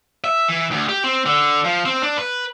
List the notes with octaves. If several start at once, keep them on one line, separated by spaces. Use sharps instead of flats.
E5
E3
D2
G4
C4
D3
F3
C4
D4
B4